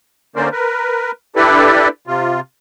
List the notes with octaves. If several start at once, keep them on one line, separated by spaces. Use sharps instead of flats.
D3 A#3 C#4 A#4 C5 D5
A#4 B4
D4 E4 G4 A4 B4 D5
C3 F4